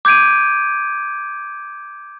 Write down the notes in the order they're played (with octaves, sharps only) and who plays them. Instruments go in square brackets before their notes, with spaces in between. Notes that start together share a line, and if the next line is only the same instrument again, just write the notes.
[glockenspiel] D6 G6 G#6 D7 D#7